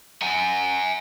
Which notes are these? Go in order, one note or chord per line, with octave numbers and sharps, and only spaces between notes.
F#5 G#5